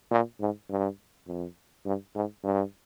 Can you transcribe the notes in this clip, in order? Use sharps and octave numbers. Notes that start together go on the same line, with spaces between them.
A#2
G#2
G2
F2
G2
G#2
G2